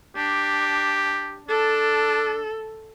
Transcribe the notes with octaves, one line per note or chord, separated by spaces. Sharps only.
D4 G4
D4 A4